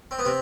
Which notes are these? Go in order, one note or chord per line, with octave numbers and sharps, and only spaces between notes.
C4
B3
C3 C4